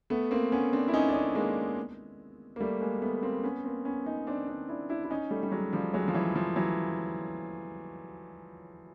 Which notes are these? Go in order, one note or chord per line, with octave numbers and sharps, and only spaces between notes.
A3 B3
A#3 C4
B3 C#4
C4 D4
E4
C#4 D#4
D4
C#4 D#4
G#3 A#3
A#3
G3 A3
G#3 A#3
A3 B3
A#3 C4
B3 C#4
A#3 C4
B3 C#4
C#4 D#4
C4 D4
C4 D4
D4 E4
D4 E4
E4
C#4 D#4
G3 A3
G3
F#3 G#3
F3 G3
F#3 G#3
F3
E3 F#3
F3
E3 F#3